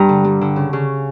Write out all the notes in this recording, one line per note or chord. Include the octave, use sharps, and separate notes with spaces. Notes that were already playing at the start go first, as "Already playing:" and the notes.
Already playing: G2 A#5
D3
G3
D3
C#3
C#3